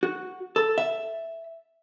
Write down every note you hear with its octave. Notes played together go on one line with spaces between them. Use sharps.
F#4
A4
E5